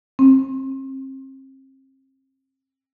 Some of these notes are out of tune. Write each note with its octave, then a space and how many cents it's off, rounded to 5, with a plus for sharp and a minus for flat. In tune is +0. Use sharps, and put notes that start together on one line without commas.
C4 +35